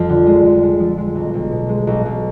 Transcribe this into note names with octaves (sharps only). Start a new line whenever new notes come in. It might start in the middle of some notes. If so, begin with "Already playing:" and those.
Already playing: F2 F3
D3
G#3
F2
G#3
F3
G#3
B1
B1
B2
G#3
B1
B1